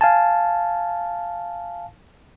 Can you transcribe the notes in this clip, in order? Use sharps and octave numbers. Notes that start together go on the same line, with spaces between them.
F5 G#5 A5